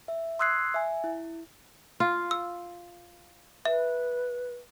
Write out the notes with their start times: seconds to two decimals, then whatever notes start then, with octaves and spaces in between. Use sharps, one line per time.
0.08 E5
0.39 C6 D#6 E6 F#6 G#6 C7
0.74 E5 G#5
1.04 E4
2.00 F4
2.31 E6
3.65 B4 E5